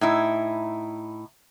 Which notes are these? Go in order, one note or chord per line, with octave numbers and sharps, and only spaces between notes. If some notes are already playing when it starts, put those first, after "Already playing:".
A2 D#4 E4